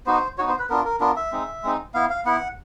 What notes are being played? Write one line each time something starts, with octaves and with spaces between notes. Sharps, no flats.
B3 D#4 F#4 C5
B3 D#4 F#4 C#5
C5
B4
B3 D4 F4 A#4
A#4
B3 D4 F4 A#4
E5
G#3 C4 D#4
G#3 C4 D#4
B3 E4 F5
F5
B3 E4 F#5